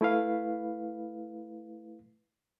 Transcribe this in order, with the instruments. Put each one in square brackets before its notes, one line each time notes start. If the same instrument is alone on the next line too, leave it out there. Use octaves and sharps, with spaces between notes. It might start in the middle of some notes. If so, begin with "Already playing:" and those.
[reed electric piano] A3 E4 B4 F5